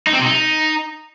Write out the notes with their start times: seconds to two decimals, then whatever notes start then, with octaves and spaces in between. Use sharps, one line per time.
0.07 D#4
0.13 C4
0.19 C3
0.25 D#4